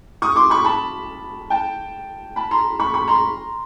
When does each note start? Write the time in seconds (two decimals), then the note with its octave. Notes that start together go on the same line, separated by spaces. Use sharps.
0.22 C#6 D#6
0.36 C6 D6
0.50 B5 C#6
0.65 A5 B5
1.50 G5 A5
2.36 A5 B5
2.51 A#5 C6
2.80 B5 C#6
2.94 B5 C#6
3.08 A#5 C6